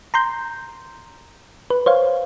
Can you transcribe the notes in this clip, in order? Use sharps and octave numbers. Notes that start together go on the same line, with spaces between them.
A#5 C6 G6
B4
C5 C#5 F5